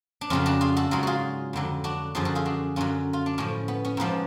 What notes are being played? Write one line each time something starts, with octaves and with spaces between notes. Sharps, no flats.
D4
F2 C#3 F#3 C#4 F4
D4 F#4
F4 G#4
F#4 A4
G#2 F#3 F4 G#4
F4 F#4 G#4
F2 D3 F#3
D4 F#4
F#2 D3 F3 F4 G#4
F#4 A4
F4 G#4
D4 F#4
F#2 D3 F#3 C#4 F4
F4
D4
A2 F3 C#4
B3
C#4
G#2 F3 B3 D4